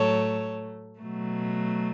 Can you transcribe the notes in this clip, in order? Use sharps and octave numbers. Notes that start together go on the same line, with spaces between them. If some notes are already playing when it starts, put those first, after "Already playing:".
Already playing: A2 F#3 A3 A4 C#5
B2 F#3 A3